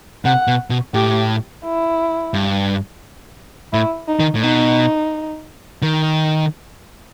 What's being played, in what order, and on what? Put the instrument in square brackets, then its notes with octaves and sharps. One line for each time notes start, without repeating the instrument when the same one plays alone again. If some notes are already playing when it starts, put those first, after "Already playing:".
[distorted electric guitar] C3 [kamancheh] F#5
[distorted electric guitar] B2
B2
[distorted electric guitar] A2 [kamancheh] G4
[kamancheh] E4
[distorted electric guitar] G2
[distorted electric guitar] A2 [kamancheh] E4
[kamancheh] D#4
[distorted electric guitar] D#3
A2
[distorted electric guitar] B2 [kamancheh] D#4
[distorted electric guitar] D#3